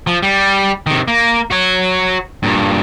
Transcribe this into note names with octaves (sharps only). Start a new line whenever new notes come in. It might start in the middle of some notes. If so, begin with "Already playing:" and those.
F3
G3
C3 D#3
A#3
F#4 C#5
G2 A#2